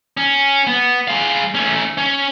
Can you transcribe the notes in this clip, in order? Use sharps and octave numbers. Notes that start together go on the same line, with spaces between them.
C#4
B3
G#3 F5
A3 C#4
C#4